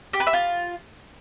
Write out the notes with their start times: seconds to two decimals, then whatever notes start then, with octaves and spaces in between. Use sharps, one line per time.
0.13 G4
0.20 B4
0.27 E5
0.33 F4